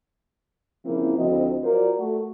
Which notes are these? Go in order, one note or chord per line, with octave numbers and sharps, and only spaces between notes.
C#3 F3 A#3 C4 E4
D2 F3 C4 E4 F#4 D#5
F#3 F4 A#4 C5 D5
A3 F#4